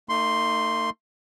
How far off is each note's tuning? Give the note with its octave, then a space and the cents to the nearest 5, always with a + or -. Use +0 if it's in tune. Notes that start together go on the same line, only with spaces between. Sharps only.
A3 +45 D#4 +0 C6 +0